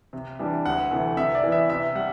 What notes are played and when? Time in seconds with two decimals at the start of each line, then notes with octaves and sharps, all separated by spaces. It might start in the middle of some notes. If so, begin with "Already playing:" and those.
0.13 C3
0.39 E3 G3 D4
0.65 D2 F#5
0.91 C3 E3 A3
1.17 C3 E5
1.35 D5
1.44 E3 B3
1.52 E5
1.70 C3 E5
1.95 G3 F#5